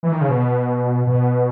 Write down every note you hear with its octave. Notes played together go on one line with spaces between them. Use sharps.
E3
D#3
C#3
B2
B2